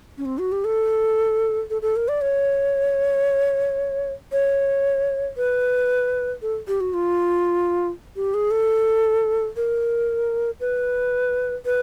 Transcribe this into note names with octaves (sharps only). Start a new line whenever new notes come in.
C#4
C4
F#4
G4
A4
A4
A4
A#4
D5
C#5
C#5
B4
A4
G4
F#4
F4
G4
G#4
A4
A#4
B4
B4